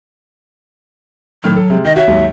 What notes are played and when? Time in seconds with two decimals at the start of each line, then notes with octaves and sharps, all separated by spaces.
1.44 A2 D#3 F#3 F6
1.56 A4
1.70 C3 G#3
1.85 D#3 D#5
1.96 F#4 C#5 E5
2.07 D#2 G#2 F#3